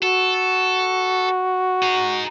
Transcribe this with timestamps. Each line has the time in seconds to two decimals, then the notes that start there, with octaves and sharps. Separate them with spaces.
0.03 F#4 A4
1.83 D#4 G#4